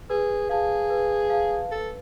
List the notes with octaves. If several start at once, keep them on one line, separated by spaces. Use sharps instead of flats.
G#4 B4
G#4 F5 A5
B4
F5 A5
A4 B4